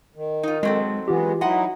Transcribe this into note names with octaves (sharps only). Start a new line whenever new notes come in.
D#3
D#4 F4
F#3 G#3 C4 A4
E3 G#3 B3 F4 G4
F#3 D#4 E4 D#5 F#5 C6